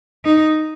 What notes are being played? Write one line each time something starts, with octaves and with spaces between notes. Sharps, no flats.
D#4